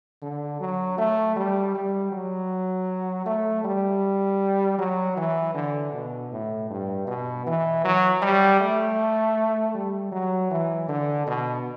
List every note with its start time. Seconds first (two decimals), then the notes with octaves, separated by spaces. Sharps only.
0.22 D3
0.60 F#3
0.98 A3
1.36 G3
1.75 G3
2.12 F#3
3.26 A3
3.64 G3
4.79 F#3
5.17 E3
5.55 D3
5.94 B2
6.32 A2
6.70 G2
7.07 B2
7.46 E3
7.84 F#3
8.22 G3
8.60 A3
9.75 G3
10.12 F#3
10.51 E3
10.89 D3
11.27 B2